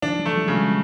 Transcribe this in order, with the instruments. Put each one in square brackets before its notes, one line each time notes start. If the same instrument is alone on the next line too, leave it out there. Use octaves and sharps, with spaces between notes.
[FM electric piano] D#3 F3 [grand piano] D4
[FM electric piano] E3 F#3
[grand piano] A3
[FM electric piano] F3 G3
[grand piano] C#3
[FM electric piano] F#3 G#3